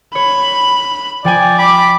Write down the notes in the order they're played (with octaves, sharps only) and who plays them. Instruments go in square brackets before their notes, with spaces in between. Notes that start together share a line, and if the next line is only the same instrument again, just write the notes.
[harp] C#5 [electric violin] B5
[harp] F3 G5 G#5 [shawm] D5
[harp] G5 [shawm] B5 [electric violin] D6